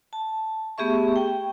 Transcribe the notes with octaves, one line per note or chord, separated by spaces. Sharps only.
A5
A3 B3 G4 G#4 E5 C#6
G5